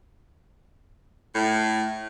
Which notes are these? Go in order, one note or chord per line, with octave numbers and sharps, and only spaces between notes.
A2